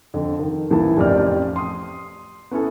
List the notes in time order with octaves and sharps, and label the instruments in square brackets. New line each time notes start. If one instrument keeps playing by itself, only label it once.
[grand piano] F2 D3
D#3
A#1 E3 E4 A#4 A5
A1 F2 G4 D5 F6
C6 D#6
B3 C#4 E4 A4